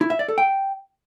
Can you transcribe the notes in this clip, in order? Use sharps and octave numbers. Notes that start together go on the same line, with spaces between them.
E4
E5
D5
A4
G5